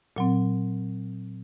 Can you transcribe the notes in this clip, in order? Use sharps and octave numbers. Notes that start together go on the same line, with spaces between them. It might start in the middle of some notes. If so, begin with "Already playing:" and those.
A#2 F#3 C4